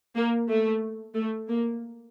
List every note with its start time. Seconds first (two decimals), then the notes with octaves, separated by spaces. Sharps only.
0.15 A#3
0.49 A3
1.15 A3
1.48 A#3